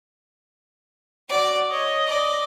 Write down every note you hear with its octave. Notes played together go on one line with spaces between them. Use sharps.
F#4 D5
C#5 D#5
D5